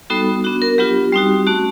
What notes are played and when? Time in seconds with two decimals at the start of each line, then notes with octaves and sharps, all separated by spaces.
0.10 G3 B3 D#4 F#4 A4
0.44 B3 D4 F#4
0.62 A#4
0.78 F#3 B3 D4 F4 G4
1.13 G3 C4 D#4 F#4
1.47 A3 C#4 F#4